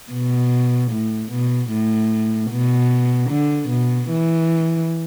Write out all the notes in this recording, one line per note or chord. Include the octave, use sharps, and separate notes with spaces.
B2
A2
B2
A2
B2
D3
B2
E3